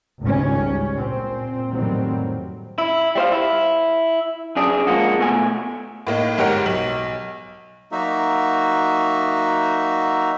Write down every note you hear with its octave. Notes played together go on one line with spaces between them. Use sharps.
G#1 C#2 G3 C#4
A#2 C4
F2 A2 D#3 F#3 G3 C4
E4
G3 C5 F5
E4
F#2 D4 G#4
F3 G#3 A#3 F#4
B2 A3 G#5
A2 A#3 D#4
G1 G#2 G4 A#4 C#5 F#5
B1 F#7
F#3 A#3 D#4 F#4 E5